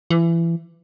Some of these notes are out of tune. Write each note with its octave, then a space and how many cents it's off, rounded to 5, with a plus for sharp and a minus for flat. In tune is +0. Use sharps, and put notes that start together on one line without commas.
E3 +25